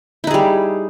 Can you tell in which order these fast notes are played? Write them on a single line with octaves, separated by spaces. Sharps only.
E4 D#4 G#4 G3